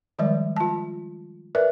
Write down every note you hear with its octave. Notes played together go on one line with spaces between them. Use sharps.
D#3 F3 G3 G#3 D5
F4 A5
A#4 B4 D5 E5